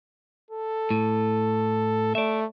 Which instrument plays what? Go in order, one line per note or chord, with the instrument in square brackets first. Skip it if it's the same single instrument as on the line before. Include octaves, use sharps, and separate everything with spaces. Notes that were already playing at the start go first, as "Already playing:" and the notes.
[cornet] A4
[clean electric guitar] A2
[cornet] A3 [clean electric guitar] D5 E5